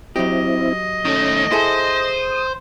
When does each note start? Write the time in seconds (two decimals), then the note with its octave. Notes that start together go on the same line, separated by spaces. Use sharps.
0.16 F#3 C4 E4 G4 D#5
1.05 D#3 A3 C#4
1.51 E4 G#4 A4 C5 D#6